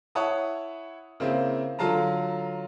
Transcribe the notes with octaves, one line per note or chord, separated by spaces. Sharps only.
E4 C#5 F#5 A5 D#6
C#3 A#3 C4 E4
D3 F#3 F4 F5 A5 A#5